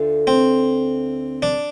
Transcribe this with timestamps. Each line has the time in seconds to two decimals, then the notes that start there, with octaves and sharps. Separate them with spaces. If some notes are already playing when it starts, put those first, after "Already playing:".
Already playing: D2 D3 A3 F4 A4
0.27 C4
1.42 D4